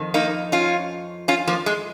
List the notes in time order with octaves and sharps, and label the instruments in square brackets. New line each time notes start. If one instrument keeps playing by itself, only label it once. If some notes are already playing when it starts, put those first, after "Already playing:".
Already playing: [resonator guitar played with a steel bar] F2 D#3
A#3 D#4
C#4 F4
C#4 F4
F3 A#3
G#3